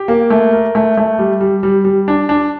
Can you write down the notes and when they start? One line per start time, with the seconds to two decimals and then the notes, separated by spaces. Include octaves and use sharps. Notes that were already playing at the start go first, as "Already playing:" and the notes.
Already playing: G4
0.08 A#3
0.30 A3
0.53 A#4
0.75 A3
0.97 A3
1.19 G3
1.41 G3
1.63 G3
1.85 G3
2.08 D4
2.29 D4